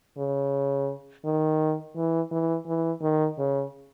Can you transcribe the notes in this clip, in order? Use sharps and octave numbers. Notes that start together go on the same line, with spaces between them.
C#3
D#3
E3
E3
E3
D#3
C#3